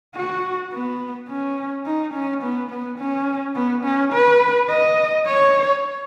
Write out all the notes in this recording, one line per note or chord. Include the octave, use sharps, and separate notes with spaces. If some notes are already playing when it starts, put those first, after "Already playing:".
F#4
B3
C#4
D#4
C#4
B3
B3
C#4
B3
C#4
B4
D#5
C#5